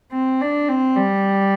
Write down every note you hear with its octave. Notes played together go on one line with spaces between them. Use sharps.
C4
D4
C4
G3